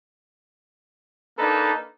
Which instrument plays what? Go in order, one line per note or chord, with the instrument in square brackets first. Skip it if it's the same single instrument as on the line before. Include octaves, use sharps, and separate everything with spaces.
[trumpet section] A#3 D4 D#4 A4 B4 A#5